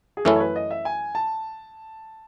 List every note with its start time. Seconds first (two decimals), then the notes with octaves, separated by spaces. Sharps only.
0.17 G#4
0.25 F#2 E3 A3 C#4 E4 A4
0.36 C#5
0.40 B4
0.56 D#5
0.71 E5
0.85 G#5
1.15 A5